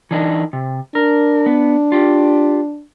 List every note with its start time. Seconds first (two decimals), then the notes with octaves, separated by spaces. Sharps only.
0.11 E3 D4 D#4
0.53 C3
0.95 D4 A#4
1.46 B3
1.92 F4 G4